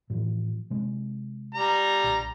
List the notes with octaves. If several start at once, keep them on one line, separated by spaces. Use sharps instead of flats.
A2 E3 F3
C3 G#3
G3 A#5
A#1